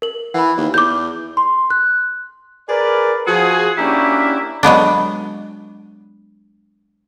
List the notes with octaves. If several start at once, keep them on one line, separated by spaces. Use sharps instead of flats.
A#4 F#7
E3 F#5 B5
D#2
E2 D6 G6
C6
F#6
G#4 A#4 B4 D5
F3 F#4 G#4
A#3 C#4 D4 E4 F#4 G4
F#3 G#3 B3 D4